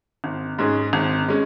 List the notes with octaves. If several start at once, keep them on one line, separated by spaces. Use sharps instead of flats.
G#1
G#2 G#3 C#4 G#4
G#1
G#3 C#4